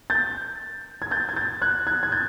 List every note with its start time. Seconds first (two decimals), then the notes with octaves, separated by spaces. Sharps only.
0.10 G6 A6
1.02 G#6
1.11 G6 A6
1.29 G#6
1.36 G6 A6
1.62 F#6 G#6
1.87 F#6 G#6
2.03 G#6
2.12 G6 A6